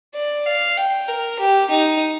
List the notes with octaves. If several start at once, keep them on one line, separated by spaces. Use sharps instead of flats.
D5
F5
G5
A#4
G4
D#4